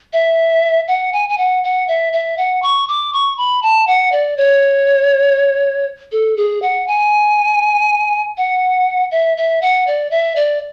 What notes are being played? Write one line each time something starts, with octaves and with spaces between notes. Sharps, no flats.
E5
F#5
G#5
G#5
F#5
F#5
E5
E5
F#5
C#6
D6
C#6
B5
A5
F#5
D5
C#5
A4
G#4
F#5
G#5
F#5
E5
E5
F#5
D5
E5
D5